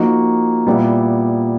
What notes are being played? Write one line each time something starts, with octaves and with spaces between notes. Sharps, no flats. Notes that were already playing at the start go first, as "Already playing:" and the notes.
Already playing: F3 A#3 D#4 F#4
A#2 G3 B3 E4